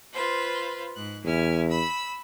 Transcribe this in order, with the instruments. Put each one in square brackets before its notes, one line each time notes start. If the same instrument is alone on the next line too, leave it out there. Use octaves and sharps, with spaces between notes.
[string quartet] F4 B4 C5
G#2 F#6
[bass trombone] E2 [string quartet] E4 G#5 F6
[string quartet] B5 E6